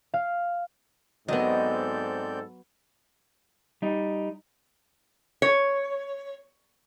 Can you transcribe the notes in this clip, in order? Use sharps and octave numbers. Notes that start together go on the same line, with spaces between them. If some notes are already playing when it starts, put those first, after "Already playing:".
F5
G#2 F#3 B3 C4 A4 D5 D#5 G6
G3 D#4
C#5